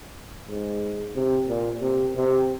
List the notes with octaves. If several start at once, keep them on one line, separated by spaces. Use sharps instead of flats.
G#2
C3
A#2
C3
C3